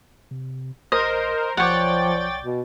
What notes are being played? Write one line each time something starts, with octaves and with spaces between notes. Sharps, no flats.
C3
A#1 A#4 C5 D#5
B1 F3 C#5 D5 F#5 G5 A6
B2